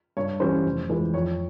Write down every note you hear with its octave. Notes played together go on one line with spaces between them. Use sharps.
G2 C#5
E3 G3 C#4 C5
F1
F2 E3 G#3
F2 C#5